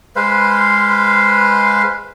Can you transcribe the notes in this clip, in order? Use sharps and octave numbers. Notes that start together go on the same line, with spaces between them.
G#3 B4 C5 F5